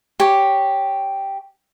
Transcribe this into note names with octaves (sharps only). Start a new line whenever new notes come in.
G4 C#5